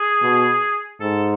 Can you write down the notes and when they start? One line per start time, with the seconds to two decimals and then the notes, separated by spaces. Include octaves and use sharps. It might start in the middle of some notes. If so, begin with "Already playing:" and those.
Already playing: G#4
0.22 B2
1.00 G#2 A4